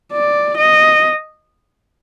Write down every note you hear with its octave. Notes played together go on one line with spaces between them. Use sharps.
D5
D#5